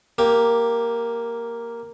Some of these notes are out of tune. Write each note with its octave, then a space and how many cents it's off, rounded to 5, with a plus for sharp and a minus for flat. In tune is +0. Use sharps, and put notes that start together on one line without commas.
A#3 +0 G4 +0